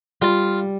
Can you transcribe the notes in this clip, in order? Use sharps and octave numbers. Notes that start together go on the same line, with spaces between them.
G3 F4